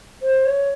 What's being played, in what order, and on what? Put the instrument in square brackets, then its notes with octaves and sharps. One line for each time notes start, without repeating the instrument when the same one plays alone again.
[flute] C5
C#5